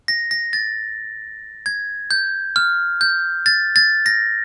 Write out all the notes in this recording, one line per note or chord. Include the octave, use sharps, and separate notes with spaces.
A#6
A#6
A6
G#6
G6
F6
G6
A6
A6
A#6